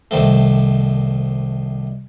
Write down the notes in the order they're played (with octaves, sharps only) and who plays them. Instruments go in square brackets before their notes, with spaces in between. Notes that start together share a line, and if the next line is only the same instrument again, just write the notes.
[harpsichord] C2 D#3 F3 A3